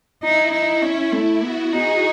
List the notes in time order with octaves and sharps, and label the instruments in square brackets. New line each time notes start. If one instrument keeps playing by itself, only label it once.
[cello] D#4 [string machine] E4
[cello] D#4 [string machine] E4
[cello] C#4
A3
[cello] B3 [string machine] F#4
[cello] D#4 [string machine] G#4